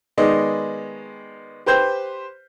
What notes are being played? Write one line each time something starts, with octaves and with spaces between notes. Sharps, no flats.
D#3 G#3 B3 D5 D#5
G4 B4 C5 G6